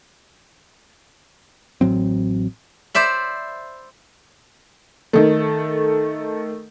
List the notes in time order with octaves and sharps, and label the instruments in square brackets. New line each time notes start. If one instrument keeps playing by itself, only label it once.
[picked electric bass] A1 A2 F#3 C4
[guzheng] C5 D5 E5 B5
[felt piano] D#3 A3